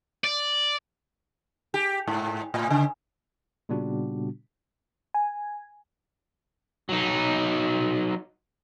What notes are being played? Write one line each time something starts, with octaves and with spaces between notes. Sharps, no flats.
D5
G4
G#2
A2
C#3
A#2 C#3 G3 B3 D4 F#4
G#5
F#3 D#4